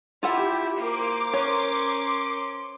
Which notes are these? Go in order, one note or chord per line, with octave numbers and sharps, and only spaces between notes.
E4 F4 G4 A4 F#5
A#3 A#4 C5 D6
C#4 B4 C#5 C6